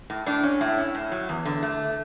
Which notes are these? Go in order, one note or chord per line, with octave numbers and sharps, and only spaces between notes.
A2
A2 D4
C#4
A2 E4
C#4
A2
F#3
E2
D3
A3